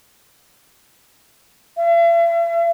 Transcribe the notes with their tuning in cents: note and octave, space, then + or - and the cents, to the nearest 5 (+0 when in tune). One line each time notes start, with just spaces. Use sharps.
E5 +45